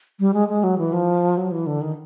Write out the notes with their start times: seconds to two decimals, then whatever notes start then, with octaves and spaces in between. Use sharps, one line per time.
0.20 G3
0.34 G#3
0.49 G#3
0.64 F#3
0.78 E3
0.93 F3
1.38 F#3
1.51 E3
1.67 D3
1.81 D#3